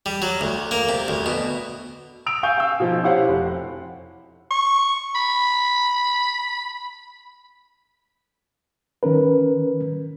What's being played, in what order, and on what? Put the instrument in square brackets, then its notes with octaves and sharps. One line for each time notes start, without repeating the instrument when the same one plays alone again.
[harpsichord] G3
F#3
D2
A#3
C3
D2
B2
[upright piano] D#6 E6 D7 F7
F5 G#5 C#6 E6 G6
F5 E6
B2 F3 D#4
E4 G4 C5 C#5 F5 F#5
F1
[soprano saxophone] C#6
B5
[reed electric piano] D#3 C#4 A#4 B4